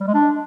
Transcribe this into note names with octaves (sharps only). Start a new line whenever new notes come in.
G3
G#3
D4